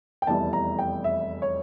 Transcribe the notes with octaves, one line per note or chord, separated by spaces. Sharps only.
G5
F1 E2 E3 G3 A5
A#5
G5
E5
C#5